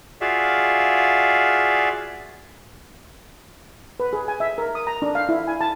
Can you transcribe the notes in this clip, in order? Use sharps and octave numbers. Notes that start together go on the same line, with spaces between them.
F4 F#4 G#4 D5 E5 F5
B4
G#4
G#5
E5
A#4
D#6
A#5
D4
F5
E4
G#5
A5